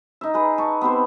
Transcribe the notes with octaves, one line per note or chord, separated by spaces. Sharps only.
D#4 E5
G#4 B4 A#5
A5 C#6
B3 C4 G4 C5